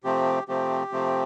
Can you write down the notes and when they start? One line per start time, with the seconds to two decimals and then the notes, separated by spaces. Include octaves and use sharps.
0.04 C3 F3 A3 C4 G4
0.48 C3 F3 A3 C4 G4
0.92 C3 F3 A3 C4